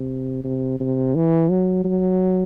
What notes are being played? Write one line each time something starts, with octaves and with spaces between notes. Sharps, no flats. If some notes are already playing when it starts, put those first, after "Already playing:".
Already playing: C3
C3
C3
E3
F#3
F#3